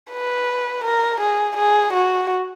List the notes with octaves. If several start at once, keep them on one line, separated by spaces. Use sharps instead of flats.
B4
A#4
G#4
G#4
F#4